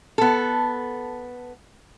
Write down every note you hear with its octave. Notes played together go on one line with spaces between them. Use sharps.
B3 A4